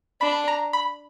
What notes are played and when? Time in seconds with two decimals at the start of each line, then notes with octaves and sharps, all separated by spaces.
0.21 D4 B5
0.48 A#5
0.73 B5